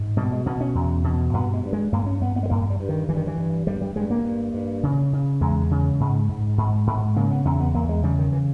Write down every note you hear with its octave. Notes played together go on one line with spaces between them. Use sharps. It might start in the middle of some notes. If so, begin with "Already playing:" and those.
Already playing: G#2
B2 G3
G#3
B2 B3
C#4
E2
B2
G2 B3
G#3
G2
G#3
G2 A#3
C#4
G2 B3
B3
G#3
G2 A#3
G3
G2
D#3
G2 E3
D#3
E3
G2
G2 G3
G3
G2 G#3
A#3
G2
G2
C#3
C#3
E2 G#3
C#3
G#2
G#2
G#2
G#2
C#3 A#3
B3
E2 C#4
B3
E2 A#3
G#3
C#3 G3
D#3
E3